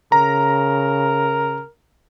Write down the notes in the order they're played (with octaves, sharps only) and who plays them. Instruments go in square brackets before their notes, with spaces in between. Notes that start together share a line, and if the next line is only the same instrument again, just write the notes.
[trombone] C#3 [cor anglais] A#4 [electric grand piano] A#5